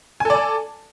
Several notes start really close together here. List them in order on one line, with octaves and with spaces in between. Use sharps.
G#5 A4 D5 A5